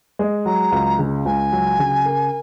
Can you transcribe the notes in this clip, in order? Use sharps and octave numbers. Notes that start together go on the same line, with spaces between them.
G#3
F#3 A#5
C#2
C#3
C#2 G#5
F#3
C#3
A#4